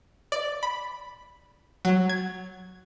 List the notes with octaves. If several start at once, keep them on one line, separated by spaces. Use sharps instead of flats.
D5
B5
F#3
G#6